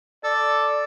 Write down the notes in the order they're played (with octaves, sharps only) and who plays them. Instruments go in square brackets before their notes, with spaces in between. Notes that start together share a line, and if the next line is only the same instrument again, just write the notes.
[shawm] A4 [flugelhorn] D5